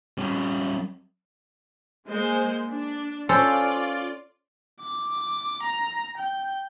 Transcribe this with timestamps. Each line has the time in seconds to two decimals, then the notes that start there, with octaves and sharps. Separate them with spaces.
0.18 G3 C#4
2.08 G#3 A#3 C5
2.70 D4
3.29 C#4 F4 A4 C5 D5
4.80 D6
5.63 A#5
6.17 G5